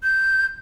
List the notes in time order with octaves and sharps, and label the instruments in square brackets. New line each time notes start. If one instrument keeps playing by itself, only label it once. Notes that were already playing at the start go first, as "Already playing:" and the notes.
[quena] G6